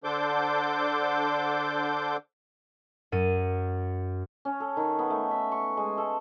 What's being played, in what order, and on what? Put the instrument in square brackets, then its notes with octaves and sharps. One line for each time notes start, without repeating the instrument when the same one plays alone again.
[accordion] D3 D4 A4 C5 D6 G6
[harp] F#2 D#7
[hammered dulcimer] C#4
A4
D#3
B3
A3
E5
C#6
G#3
A4